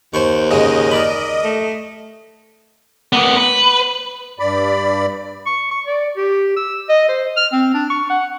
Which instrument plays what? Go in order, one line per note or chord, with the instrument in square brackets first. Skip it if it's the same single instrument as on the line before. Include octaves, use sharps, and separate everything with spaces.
[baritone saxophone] D#2 [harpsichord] C5 C#6
[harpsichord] G#2 C#3 G#3 [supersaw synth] D#5
[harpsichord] A#4 D5 B5
[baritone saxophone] A3
[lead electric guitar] A#3 B3
B4
[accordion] G2 D5 B5
[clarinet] C#6
C#6
D5
G4
E6
D#5
C5
F6
C4
D4
C#6
F#5